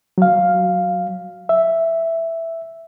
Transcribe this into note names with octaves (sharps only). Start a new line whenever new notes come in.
F#3 F5
E5